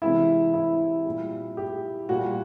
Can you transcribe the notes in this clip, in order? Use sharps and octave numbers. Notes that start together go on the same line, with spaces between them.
C3 E3 G#3 E4
E4
A#2 G3
G4
A#2 G3 F#4